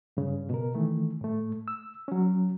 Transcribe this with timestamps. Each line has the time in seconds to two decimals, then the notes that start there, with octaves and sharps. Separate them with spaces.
0.17 G2 C#3
0.50 B2 A#4
0.75 D#3 E3 A3
1.21 A2 A3
1.68 E6
2.08 F#3 C#4